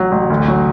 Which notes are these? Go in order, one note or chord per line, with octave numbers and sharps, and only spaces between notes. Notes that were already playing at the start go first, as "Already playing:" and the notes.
Already playing: A1 F#3
A1
D2
F#3